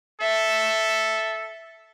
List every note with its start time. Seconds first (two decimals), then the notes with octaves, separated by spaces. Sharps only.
0.21 A4 E5